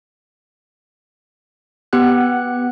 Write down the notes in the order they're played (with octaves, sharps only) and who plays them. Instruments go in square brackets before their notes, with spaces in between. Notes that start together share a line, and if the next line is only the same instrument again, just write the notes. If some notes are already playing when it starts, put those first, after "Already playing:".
[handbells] B3 G4 F#5 F#6